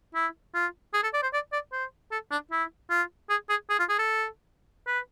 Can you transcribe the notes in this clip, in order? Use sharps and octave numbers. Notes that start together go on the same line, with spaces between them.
E4
F4
G#4
A4
D5
C5
D5
D5
C5
A4
D4
E4
F4
G#4
G#4
G#4
F4
G#4
A4
B4